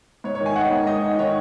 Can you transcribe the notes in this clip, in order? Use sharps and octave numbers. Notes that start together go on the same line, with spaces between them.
G#2 C#5
C#5
D#3
G#5
D#4 F#5
G#2
D#4 D#5
D#4
D#3 C#5